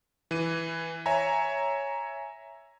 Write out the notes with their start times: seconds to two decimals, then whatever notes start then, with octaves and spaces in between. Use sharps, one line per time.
0.31 E3 D#7
1.06 C#5 E5 G#5 A#5